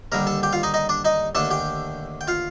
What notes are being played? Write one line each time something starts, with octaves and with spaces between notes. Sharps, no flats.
D#2 D3 G3 A#4 A#5
A4 A5
G4 G5
F4 F5
D#4 D#5
D#4 D#5
D4 D5
D#4 D#5
D#2 D3 A3 D4 A4 A5
G4 G5
G5
F4 F5